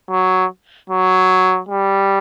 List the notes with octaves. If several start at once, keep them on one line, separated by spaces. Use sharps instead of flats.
F#3
F#3
G3